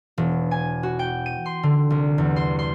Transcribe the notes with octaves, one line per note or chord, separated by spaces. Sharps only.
E1
G#5
F#4
G5
D#7
C6
D3
C2
E2
C6
C6